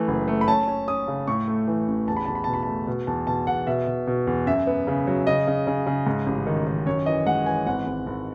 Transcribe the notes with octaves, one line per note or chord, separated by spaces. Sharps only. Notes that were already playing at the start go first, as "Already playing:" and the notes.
Already playing: E3 A3
F#1
A3
B5
C#4 A5
C#4
C#4 D#6
C#3
A2 C#6
A3
E3
A1
E2 A5
B5
E2 A5
B5
B2 A5
B5
A3 A5
B2
E2 A5
B2 A5
E2 F#5
B2 E5
B2
B2
E2
F#2 E5
B3
C#3
F#3
C#3 D#5
C#3
C#3
C#3
G#2
A1
D#3
D#3
F#2 C#5
E3 D#5
G#3 F#5
E3 G#5
G#1 F#5
G#1
G#1